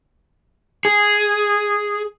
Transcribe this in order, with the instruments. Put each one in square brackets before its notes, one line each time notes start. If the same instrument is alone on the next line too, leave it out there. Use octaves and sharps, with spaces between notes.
[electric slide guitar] G#4